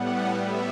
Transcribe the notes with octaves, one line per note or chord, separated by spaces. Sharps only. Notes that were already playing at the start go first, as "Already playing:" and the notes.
Already playing: A2 G3 B3 F#5
E5